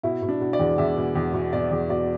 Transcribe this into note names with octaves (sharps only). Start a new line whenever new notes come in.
B2 E4
B2
D4
B2
D5
E2
E2 E5
B2
E2
B2
B2 D5
E2
B2 D5